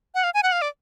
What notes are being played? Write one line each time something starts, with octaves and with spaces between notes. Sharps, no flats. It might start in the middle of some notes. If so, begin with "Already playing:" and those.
F#5
F5
G#5
F#5
F5
D5